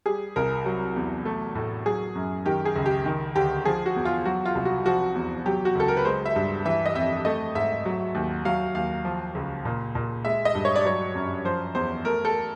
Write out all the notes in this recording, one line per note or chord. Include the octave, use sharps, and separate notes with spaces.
G3 G#4
C2 A#4
F#3
E2
A3
A2
F#3 G#4
F#2
D#3 G4
G#4
C#2
G4
D#3
D2 G4
F3 G#4
F#4
E2
F4
F#3 F#4
F4
C2
F#4
F3 F#4
E2
F#3 G4
F#4
C#2 A4
A#4
B4
G#3 C5
E5
G2
E3 E5
D#5
F2 E5
A3 D#5
G#2 E5
F#3
D#2
F#3 F5
D#2 F5
F3
C#2
A#2
A#2
G#3 E5
D#5
G2
C#5
D5
F#3 C#5
F#2
F3 C5
E2 C5
A3 A#4
A4